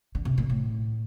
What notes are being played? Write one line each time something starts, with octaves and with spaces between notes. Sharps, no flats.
D3
C3
A#2
A2